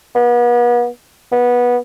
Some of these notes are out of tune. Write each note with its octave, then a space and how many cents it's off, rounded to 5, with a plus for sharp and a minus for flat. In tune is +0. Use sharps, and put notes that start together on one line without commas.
B3 -40
B3 -15